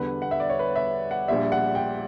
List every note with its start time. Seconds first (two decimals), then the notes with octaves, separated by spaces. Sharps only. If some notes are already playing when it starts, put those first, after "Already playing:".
Already playing: E2 D3 G3 B4
0.22 F#5
0.31 E5
0.40 D5
0.50 C#5
0.59 B4
0.76 E5
1.11 F#5
1.28 A#1 A#2 G3 E5
1.52 F#5
1.75 G5